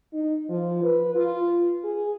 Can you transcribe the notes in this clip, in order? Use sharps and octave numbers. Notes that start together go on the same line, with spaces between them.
D#4
F3
B4
F4
G#4